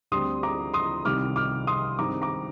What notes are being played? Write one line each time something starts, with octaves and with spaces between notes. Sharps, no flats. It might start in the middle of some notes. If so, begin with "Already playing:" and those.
D2 D3 G3 C4 C6 D#6
A#5 D6
C6 D#6
C2 C3 D#3 G3 D6 F6
D6 F6
C6 D#6
G2 D#3 G#3 C4 A#5 D6
A#5 D6